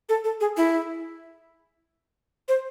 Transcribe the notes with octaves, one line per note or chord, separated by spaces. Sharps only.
A4
A4
G#4
E4
C5